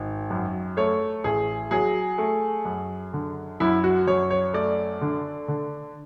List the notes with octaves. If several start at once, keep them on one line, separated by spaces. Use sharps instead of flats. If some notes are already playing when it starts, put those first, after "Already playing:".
Already playing: G#1
F#2
A3 C#5
A1 G#4
F#3 G#4
A3
F#2
D3
F#2 E4
F#4
F#2 C#5
C#5
A3 D5
D3
D3